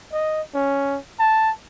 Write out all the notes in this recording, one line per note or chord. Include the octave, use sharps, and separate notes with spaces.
D#5
C#4
A5